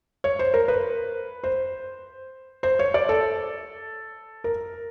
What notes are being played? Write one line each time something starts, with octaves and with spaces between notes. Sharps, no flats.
C#5
C5
A#4
B4
C5
C5
C#5
D5
A4
A#4